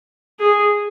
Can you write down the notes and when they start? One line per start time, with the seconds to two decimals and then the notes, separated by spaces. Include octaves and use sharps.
0.39 G#4